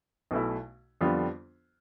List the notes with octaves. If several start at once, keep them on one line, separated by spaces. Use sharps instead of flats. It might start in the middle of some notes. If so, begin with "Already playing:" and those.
B1 B2 A3 E4
F2 D3 G3 B3 F4